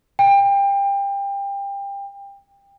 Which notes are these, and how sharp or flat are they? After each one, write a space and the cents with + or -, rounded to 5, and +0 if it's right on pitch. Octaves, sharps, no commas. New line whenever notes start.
G5 +25